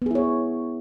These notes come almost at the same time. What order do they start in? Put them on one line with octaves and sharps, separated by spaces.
B3 G#4 E4 C#5